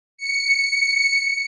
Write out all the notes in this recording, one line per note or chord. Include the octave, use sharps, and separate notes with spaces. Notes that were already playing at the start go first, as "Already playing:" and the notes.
C#7